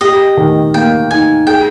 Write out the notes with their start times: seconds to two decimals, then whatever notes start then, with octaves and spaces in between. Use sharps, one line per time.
0.01 G4 D#5
0.37 D#3
0.74 A#3 G5
1.10 D#4 G#5
1.47 G#4 G5